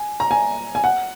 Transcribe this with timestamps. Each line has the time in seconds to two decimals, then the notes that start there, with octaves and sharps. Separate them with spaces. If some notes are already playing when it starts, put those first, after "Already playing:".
Already playing: G#5
0.20 A#5
0.31 G#5
0.75 G#5
0.84 F#5